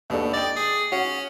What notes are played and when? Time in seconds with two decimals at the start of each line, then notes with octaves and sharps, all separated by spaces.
0.10 D#2 B2 D4 A4
0.33 D5 D#5 G5
0.56 G#4
0.92 C#4 F#4